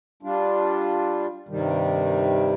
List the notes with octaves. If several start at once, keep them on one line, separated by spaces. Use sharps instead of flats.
G3 D4 F4
G2 C3 D#3 G3